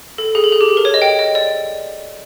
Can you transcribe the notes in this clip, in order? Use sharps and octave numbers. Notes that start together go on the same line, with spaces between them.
A4
G#4
A4
G#4
G4
G#4
A#4
C#5
D#5
G5
D#5
D5